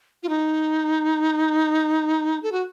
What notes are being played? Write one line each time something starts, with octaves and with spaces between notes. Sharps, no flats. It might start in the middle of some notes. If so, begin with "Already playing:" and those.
F4
D#4
A4
F#4